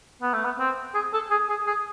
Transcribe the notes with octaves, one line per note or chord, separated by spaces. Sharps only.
B3
A3
B3
C4
G#4
A4
G#4
G#4
G#4